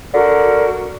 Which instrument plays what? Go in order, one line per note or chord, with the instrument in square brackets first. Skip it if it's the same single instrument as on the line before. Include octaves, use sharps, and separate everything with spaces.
[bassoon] D3 [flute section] F#4 A#4